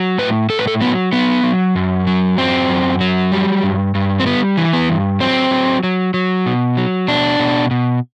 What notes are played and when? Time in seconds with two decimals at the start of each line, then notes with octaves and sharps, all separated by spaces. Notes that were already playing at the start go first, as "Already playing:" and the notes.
Already playing: F#3
0.18 A2 B4
0.49 A2 A4
0.59 B4
0.68 A4
0.81 F#3 B3
1.12 F#3 B3
1.43 F#3
1.76 F#2
2.07 F#3
2.38 F#2 C4
2.69 F#2
3.01 F#3
3.32 G3
3.63 G2
3.95 G2
4.20 C4
4.26 G3 B3
4.57 E3
4.73 B3
4.89 G2
5.20 F#3 C4
5.51 F#3
5.83 F#3
6.14 F#3
6.46 B2
6.77 F#3
7.08 B2 D4
7.39 B2
7.71 B2